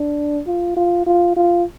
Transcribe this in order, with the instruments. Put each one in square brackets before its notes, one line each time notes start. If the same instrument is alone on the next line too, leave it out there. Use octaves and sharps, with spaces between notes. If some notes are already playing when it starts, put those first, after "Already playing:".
Already playing: [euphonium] D4
F4
F4
F4
F4